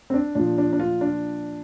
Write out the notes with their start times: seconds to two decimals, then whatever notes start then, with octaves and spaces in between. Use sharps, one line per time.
0.10 C4
0.14 D4
0.35 A#2 F3 D4
0.58 D4
0.73 D4
0.80 F4
1.01 D4